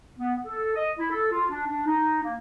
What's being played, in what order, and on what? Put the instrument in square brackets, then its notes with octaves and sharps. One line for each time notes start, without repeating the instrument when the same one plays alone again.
[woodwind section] B3
A4
D#5
E4
A4
F4
D4
D4
D#4
A#3